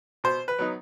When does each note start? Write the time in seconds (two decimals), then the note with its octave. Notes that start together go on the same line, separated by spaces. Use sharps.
0.24 B2 C5
0.48 B4
0.59 F#3 B3 D#4